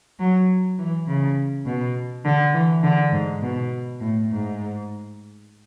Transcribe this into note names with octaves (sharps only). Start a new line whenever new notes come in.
F#3
E3
C#3
B2
D3
E3
D3
G#2
B2
A2
G#2